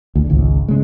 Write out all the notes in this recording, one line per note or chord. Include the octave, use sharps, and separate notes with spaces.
D2
G#1 C#2
C#3 G#3